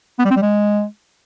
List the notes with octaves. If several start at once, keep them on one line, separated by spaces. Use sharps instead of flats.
B3
G3
C4
G3
G#3